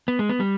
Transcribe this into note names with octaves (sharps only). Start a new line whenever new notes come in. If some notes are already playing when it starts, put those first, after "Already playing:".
B3
G#3
B3
G3